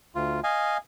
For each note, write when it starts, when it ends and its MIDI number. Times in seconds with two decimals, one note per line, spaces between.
0.15 0.40 38
0.15 0.40 65
0.44 0.77 75
0.44 0.77 77
0.44 0.77 80